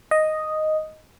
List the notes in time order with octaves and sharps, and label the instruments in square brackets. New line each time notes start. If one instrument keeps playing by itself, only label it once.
[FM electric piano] D#5